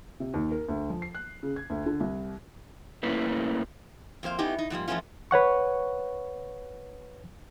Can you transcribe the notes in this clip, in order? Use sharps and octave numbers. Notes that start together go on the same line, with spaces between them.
C3
D#2
A#4
D2
F3
C7
F#6
C#3
G#6
D2
D3
C2
A3 A#3 C#4 E4 B4
F2 A#3 C5 F5
B3 C#4 D#4 E4 G4
D#4
G#2 F3 G3 A#3
E3 F3 A3 B3 C#4 F4
B4 C#5 F#5 C#6